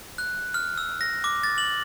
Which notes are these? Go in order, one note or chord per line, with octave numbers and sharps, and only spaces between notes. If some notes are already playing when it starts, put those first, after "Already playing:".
F#6
F6
E6
A#6
D6
A6
F#7